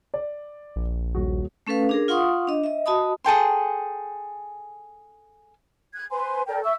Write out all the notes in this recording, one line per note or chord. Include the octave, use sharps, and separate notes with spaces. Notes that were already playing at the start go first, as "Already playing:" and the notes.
D5
A#1
D#1 F#4
A3 C#4 A4 B4 F5
D4 G#4 A#4
F4 F5 F#5 C6 C#6 D#6
D4 D#5
D#5 E5
F#4 D#5 A5 B5 D#6
G#4 A4 G5 C6
F#6 G#6
B4 C5 G#5 C6
A4 A#4 D5 G5
E5 C#6 E6